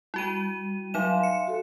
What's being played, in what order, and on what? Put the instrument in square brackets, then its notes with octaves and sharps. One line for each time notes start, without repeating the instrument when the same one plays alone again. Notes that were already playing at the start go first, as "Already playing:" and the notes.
[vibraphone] G3 [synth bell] E4 F#4 D#7
[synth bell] F#3 D#4 E7 [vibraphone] E5 F5 C6
[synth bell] C#7
[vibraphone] F#4 A4